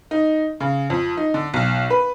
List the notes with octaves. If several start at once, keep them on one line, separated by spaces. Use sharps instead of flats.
D#4
C#3
F2
D#4
D3
B1
B4